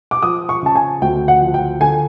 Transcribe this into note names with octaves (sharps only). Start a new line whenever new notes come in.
D6
F3 D#6
C#6
C#3 A5
G#5
D2 G5
F#5
F3
G5
D3 G#5